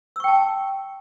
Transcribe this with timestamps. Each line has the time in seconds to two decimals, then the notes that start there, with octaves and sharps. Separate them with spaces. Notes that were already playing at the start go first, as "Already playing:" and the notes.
0.16 E6
0.20 C#6
0.24 G5
0.28 A5